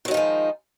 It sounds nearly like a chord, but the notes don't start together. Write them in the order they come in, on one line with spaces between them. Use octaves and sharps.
D#3 F#3 D#4 F3 G#3